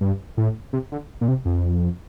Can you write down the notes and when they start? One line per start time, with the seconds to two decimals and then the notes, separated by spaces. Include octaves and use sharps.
0.01 G2
0.37 A2
0.73 C3
0.92 D3
1.21 A#2
1.28 C3
1.45 F2